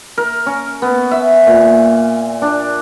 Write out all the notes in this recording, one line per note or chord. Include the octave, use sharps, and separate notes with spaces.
A#4
C#4
B3
E5
A#2
D4